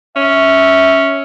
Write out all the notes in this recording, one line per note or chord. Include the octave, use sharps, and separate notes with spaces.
C#4 E5